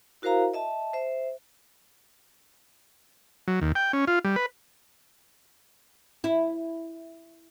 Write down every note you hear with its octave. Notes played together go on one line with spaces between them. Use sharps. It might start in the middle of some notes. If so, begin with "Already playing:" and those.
E4 F#4 A#4 C5 F5 A#5
D#5 E5 A5
C5 E5
F#3
D#2
G5
C#4
F4
G3
B4
E4